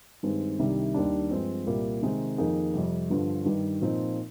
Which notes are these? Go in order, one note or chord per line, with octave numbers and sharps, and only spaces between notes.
G2 D#3 G#3 C4 D#4
C2 C3 D#3 G3 D4
D#2 D#3 G3 D4
G2 F3 G#3 C4
C2 A#2 G3 A#3
C3 D#3 G#3 C4 D#4
F2 D#3 A#3 D#4 G#4
F2 C3 G3
G2 D3 F3
G2 D#3 G3
A#2 F3 C4 D#4